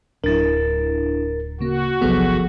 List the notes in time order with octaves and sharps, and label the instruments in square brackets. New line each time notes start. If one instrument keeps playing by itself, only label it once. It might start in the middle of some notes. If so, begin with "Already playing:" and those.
[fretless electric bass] D1 F#3 [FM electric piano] D4 E4 [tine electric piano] A#4 A6
[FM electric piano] C#3 A#3 [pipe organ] F#4
[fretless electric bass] G1 C2 [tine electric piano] F3 G#4 A4 [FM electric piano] F#3 B3